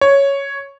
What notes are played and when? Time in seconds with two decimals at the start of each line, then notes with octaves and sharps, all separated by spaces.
0.01 C#5